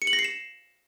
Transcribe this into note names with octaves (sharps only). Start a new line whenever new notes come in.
C#7
F#7
A#6
C7
E7